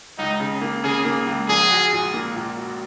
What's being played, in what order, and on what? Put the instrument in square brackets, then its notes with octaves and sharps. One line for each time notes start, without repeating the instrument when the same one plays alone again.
[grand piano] C#2 [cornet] D#4
[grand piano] C#3
A#3
[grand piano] C#3 [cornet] G#4
[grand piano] A#3
C#2
[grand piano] A#1 [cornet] G#4
[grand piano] F#4
A#2
A#3
A#2
F#4